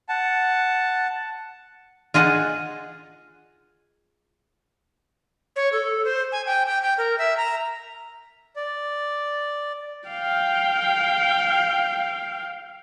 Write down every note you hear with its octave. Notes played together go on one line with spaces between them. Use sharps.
F#5 A5
F4 G#4 D#5 F#5 A5
C#5
A4
C5
G#5
G5
G5
G5
A#4
E5
A#5
D5
F5 G5